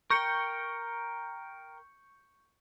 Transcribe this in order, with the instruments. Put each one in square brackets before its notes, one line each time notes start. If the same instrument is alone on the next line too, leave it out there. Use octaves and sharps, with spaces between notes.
[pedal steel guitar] A#4 G5 [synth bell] C#6 G6 C#7